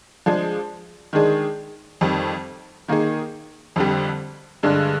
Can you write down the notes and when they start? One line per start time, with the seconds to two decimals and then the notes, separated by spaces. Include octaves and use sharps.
0.26 F3 G#3 D4 G#4
1.13 D#3 G#3 D4 G#4
2.01 F2 D#3 G3
2.88 D#3 A#3 D#4 G#4
3.76 F2 D3 G3
4.63 G2 D3 G#3 D4 G#4